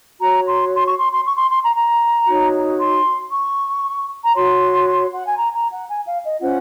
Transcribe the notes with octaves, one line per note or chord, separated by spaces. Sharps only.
F#4 C#5 A#5
C6
C6
C#6
C6
C6
C#6
C6
C6
A#5
A#5
D#4 F#4 C#5
C6
C#6
A#5
F#4 C#5 C6
F#5
G#5
A#5
A#5
F#5
G#5
F5
D#5
C#4 F4 C5 F#5